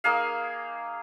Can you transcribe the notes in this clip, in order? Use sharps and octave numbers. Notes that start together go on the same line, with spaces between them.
A#3 D#4 G#4 F5